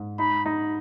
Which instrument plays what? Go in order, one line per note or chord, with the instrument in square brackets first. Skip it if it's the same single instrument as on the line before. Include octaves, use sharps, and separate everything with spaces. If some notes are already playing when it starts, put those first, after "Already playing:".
Already playing: [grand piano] G#2
[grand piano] D#4 [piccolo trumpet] B5
[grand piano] D#4